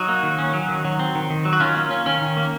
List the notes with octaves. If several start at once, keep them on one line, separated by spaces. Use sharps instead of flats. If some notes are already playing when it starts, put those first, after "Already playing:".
Already playing: F#3 D#4 F#4
A#3
D#3
C#4
F#3
D#3
F#3
C4
D#3
D#3
F#3
F#4
D#3 C#4 F4
A#3
C#4
D#3 C#4
D#3
A#3